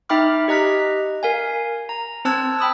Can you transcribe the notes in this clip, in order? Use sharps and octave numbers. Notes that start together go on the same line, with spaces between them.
D#4 E5 G5 B5 D6 F6
G4 D#5 A#5 F#6 B6
A#4 F5 G#5
A#5
C4 C5 A5 E6 F#6 G#6
G5 B5 D#6 E6